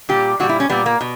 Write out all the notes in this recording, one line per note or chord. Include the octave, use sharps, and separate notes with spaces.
A#2 G3 G4
A#2 G3 F#4
E4
C#4
A#2 G3 B3
A#3
B2